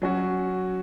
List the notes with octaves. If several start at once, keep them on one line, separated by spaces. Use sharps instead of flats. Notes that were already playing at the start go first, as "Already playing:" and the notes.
F#3 C#4 F#4